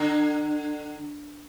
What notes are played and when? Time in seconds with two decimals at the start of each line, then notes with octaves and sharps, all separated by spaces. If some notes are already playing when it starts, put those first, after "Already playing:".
Already playing: D3